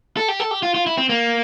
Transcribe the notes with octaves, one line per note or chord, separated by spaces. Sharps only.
A4
G4
A4
G4
F4
F4
E4
C4
A#3